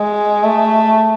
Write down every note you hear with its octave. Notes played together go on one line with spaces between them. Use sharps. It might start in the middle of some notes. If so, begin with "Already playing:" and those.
Already playing: G#3
A3